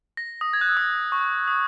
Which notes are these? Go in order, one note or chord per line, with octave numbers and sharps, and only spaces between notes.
A#6
D#6
G#6
F#6
E6
D#6
C#6
D#6